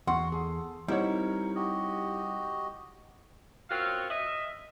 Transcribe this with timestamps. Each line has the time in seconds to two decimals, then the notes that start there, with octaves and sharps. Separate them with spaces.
0.07 E2 F#4 F#5 C6
0.32 G#4 A4
0.88 G3 C4 D#4 E4 A#4 C#5 F#5
1.55 F#4 G4 D#5
3.70 F#2 C4 F4 F#4 C#5 F5
4.10 D#5 E5